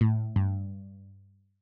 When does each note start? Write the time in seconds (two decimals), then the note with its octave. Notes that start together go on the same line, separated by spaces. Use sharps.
0.01 A2
0.36 G2